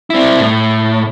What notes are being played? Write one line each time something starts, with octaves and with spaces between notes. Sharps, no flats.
C4 E4
A2